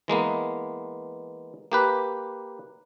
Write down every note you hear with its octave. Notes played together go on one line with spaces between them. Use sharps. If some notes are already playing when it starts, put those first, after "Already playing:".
E3 G#3 A#3 B3
A#3 G4 B4